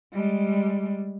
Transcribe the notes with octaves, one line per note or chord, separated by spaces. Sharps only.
G3 G#3